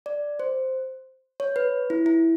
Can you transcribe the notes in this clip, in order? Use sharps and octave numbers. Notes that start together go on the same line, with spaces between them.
D5
C5
C#5
B4
E4
E4